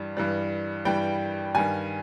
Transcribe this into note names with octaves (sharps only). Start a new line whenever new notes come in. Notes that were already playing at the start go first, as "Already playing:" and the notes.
Already playing: G2 E3 G3
G2 E3 G3
G2 E3 G3 G5
G2 D#3 G3 G#5